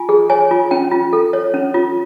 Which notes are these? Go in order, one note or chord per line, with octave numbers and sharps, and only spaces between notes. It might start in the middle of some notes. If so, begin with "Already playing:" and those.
Already playing: F4 G#5
G#4
C#5 G#5
F4
C#4 G5
F4
A4
C#5
C#4
F4